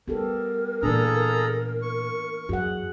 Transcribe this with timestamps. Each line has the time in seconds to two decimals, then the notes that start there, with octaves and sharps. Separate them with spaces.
0.08 G3 B3 G4 A4 A#4
0.83 A#2 E3 A#3 D4 G#4 A4 A#5
1.82 C#6
2.49 F#2 F#4 G#4 F#5